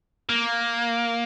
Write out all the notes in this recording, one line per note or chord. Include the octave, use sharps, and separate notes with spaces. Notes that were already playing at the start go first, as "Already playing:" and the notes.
A#3